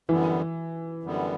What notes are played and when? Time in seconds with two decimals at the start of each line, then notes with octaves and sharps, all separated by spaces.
0.09 F#2 D3 E3 G3 B3
1.03 F#2 D3 G3 B3